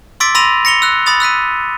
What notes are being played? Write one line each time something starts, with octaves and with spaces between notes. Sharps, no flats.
C6 D6 E6 A6 B6 D7
B5 C6 E6 A#6 D#7 F7
A#6 C#7 F7 G7
E6 F#6
B5 D#6 A6 F7
E6 F#6 B6 D#7